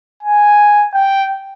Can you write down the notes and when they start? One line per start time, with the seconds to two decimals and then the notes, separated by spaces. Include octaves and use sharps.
0.23 G#5
0.94 G5